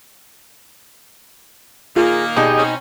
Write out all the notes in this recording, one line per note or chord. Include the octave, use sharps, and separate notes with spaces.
A#2 D#3 A#3 F4 G#4
B2 D#4 G4 G#4 D#5 A5
C4 C#4